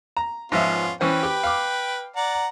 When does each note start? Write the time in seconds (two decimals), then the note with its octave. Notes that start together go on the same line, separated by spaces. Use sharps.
0.17 A#5
0.52 G#2 F3 B3 C#4 F4 E5
1.01 E3 C#4 B4 C5 G5
1.23 G4
1.44 F5 D6
2.16 D5 F#5 A#5